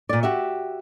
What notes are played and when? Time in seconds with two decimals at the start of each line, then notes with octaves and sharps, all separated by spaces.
0.09 A#2 D5
0.23 F#4 G4 E5